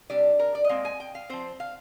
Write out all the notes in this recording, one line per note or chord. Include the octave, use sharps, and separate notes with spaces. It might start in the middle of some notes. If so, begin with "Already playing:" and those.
C3 G3 D4 D5
A#4
D5
D#5
A#2 G#3 C4 F5
G#5
G5
F5
F3 C4 C5
F5